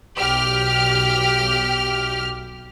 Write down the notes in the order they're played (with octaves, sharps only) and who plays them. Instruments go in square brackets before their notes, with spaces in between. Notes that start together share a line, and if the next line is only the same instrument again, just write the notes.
[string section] B1 G4 F6